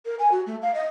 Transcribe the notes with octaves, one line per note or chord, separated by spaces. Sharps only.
A#4
G#5
F#4
A3
F5
D#5